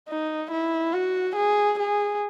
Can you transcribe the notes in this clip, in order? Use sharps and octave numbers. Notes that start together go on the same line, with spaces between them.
D#4
E4
F#4
G#4
G#4